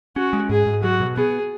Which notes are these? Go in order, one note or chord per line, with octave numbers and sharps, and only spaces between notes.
C#4 F#4
G#3
G#2 G#4
G#2
F#3 F#4
B2
B3 G#4